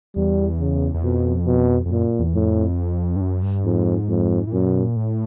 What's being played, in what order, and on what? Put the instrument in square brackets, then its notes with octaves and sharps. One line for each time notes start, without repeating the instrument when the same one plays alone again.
[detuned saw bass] E2 [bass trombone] G3
[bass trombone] C#3
[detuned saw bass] E2
[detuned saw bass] F2 [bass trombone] B2
[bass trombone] B2
[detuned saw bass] F2
[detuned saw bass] F#2 [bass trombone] A#2
[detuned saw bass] E2
[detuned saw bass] F2 [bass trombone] A2
[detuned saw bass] G2
F#2
G2
[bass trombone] F2 [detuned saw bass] G#2
[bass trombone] F2
[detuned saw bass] A2
[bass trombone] F#2 [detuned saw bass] A#2
[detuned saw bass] B2
A#2
A2